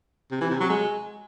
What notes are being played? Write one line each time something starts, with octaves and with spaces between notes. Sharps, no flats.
C3
E3
C3
F#3
G#3